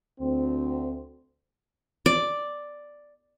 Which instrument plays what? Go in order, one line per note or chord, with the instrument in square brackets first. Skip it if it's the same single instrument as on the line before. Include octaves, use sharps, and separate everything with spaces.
[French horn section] D2 C4
[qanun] D5